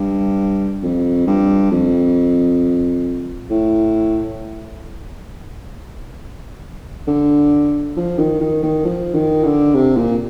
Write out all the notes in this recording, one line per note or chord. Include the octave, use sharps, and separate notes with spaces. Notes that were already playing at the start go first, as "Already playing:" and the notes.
Already playing: G2
F2
G2
F2
A2
D3
F3
D#3
D#3
D#3
F3
D#3
D3
C3
A#2